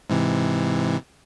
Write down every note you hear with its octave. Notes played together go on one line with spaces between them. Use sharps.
G#2 C3 E3